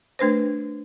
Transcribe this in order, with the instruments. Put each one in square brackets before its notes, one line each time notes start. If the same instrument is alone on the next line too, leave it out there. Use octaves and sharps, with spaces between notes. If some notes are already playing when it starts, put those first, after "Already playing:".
[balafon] A3 D4 B4 C5